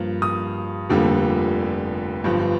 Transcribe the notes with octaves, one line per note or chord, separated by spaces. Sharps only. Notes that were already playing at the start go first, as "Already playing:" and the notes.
Already playing: G2 F3 A#3
D#6
F1 F2 D3 G3 A#3
G1 G2 F3